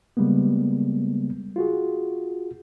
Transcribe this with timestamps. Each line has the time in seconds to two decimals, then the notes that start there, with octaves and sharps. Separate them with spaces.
0.17 C#3 G3 G#3 A#3 B3
1.56 F4 F#4 G#4